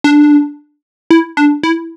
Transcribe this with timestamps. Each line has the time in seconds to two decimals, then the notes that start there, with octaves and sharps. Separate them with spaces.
0.04 D4
1.11 E4
1.37 D4
1.63 E4